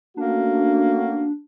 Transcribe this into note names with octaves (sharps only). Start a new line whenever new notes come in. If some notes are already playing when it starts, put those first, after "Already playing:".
A3 A#3 C#4 D4 F#4